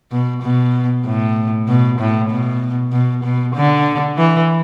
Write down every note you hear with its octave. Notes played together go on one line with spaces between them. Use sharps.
B2
B2
A2
B2
A2
B2
B2
B2
D3
E3